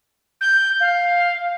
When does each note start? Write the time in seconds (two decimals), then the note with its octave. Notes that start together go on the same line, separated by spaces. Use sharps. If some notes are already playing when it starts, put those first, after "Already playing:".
0.41 G6
0.80 F5